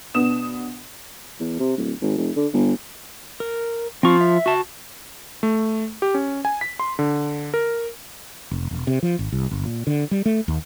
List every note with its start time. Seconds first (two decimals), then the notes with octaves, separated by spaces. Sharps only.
0.14 B2 B3 D4 D#6 E7
1.40 E2
1.60 C3
1.77 D1
2.02 G#1
2.17 F1
2.36 D3
2.53 G1
3.40 A#4
4.03 F3 C4 F4 C#6
4.21 E5
4.46 F#4 A5
5.43 A3
6.02 G4
6.14 C#4
6.45 G#5
6.61 B6
6.80 C6
6.99 D3
7.54 A#4
8.51 F1
8.71 E1
8.87 C3
9.03 F3
9.19 G#1
9.32 C2
9.51 G1
9.65 A#2
9.87 D3
10.11 G3
10.25 A3
10.48 D#2